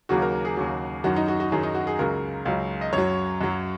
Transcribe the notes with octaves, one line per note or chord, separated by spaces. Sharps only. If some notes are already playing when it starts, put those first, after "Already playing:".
D#2 C#3 F#3 F#4
A#4
G#4
D#2 C#3 F#3
F#2 D#3 F#3 F#4
D#4
F#4
F#4
F#2 D#3 F#3 G#4
D#4
F#4
G#4
C#2 C#3 F#3 A#4
C#2 C#3 F#3
D#5
F#2 C#5
F#3
F#2 F#3